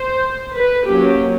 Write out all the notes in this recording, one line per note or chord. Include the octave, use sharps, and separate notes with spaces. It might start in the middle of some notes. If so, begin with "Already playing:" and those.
Already playing: C5
B4
F#3 A#3 C#4 G4